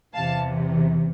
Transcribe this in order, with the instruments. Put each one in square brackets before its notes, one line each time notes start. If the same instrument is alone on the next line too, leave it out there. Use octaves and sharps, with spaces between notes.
[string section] E2 C3 E3 F5 A5